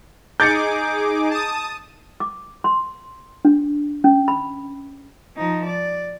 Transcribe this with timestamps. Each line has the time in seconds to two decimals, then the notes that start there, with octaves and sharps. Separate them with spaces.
0.40 D#4 G#4 D6 G6 A6 C#7
1.31 A5 D#6
2.20 D6
2.64 C6
3.45 D4
4.04 C#4
4.28 B5
5.37 F3 D#4
5.66 D5